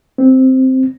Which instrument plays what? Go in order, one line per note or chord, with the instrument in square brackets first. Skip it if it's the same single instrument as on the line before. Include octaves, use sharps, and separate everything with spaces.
[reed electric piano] C4